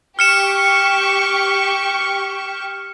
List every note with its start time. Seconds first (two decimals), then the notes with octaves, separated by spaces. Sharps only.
0.19 G4 C#6 F6 C#7 E7